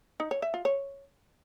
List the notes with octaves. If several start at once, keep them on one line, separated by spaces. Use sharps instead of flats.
D#4
C#5
E5
F4
C#5